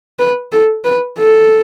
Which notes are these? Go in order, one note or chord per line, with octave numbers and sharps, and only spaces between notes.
B4
A4
B4
A4